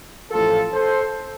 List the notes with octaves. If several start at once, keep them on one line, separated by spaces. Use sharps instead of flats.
A1 A2 F3 F4 A4
A4 C5